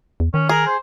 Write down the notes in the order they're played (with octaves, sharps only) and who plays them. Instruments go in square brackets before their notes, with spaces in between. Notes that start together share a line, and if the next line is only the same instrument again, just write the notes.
[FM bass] E2
[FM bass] D#3 [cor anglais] C#4
[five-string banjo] G#4 [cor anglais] A#4
[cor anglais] C5